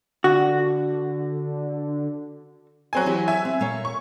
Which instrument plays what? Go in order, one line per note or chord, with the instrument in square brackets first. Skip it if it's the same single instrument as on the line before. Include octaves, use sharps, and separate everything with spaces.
[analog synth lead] D3 [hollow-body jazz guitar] F#4
[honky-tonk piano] F#3 C4 G#5
[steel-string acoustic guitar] E3 E4 G4
[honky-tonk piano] E5 G#5
[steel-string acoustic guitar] C4
A#2 A#3 C#5
[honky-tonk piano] C#6